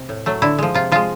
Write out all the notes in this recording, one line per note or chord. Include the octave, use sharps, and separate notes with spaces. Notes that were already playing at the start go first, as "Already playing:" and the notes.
Already playing: C3
A2
F#3 A3
D3 E4
F3 G#3
C3 F4
F3 G#3 F4